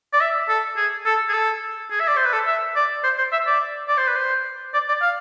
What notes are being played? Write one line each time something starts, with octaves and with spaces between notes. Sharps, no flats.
D5
E5
A4
G#4
A4
G#4
A4
G#4
E5
D5
C5
B4
A4
E5
D5
C5
C5
E5
D5
D5
C5
B4
C5
D5
D5
F5